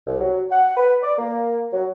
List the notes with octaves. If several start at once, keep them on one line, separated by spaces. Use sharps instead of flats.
C2
F#3
F#5
B4
D5
A#3
F#3